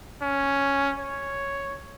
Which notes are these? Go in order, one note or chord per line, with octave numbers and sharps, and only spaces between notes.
C#4
C#5